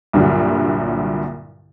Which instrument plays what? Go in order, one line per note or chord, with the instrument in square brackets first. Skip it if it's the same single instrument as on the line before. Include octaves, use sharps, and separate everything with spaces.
[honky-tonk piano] C2 G2 A#2 D3 F#3 G3